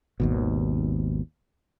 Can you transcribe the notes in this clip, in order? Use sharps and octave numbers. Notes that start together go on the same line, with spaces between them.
G#1 D#2 B2